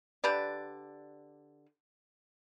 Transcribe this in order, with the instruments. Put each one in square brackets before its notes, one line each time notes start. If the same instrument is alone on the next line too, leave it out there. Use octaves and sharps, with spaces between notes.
[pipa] D3 G4 B4 D5